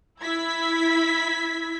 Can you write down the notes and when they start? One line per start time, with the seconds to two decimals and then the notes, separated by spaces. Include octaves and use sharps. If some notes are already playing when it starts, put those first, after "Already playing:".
0.22 E4 G#6 B6